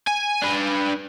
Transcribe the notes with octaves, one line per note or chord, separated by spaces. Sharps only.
G#5
D4 B4